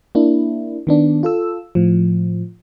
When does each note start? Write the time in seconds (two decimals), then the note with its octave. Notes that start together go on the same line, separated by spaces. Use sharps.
0.15 A#3 D4 E4
0.87 D#3 B3 D4
1.23 F4 A4 E6
1.75 A2 F3